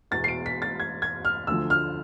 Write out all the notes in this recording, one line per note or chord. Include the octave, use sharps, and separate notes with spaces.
E1 E2 B2 A6
C7
D7
B6
A6
G#6
G#6
F6
D2 D3 F3 E6
F6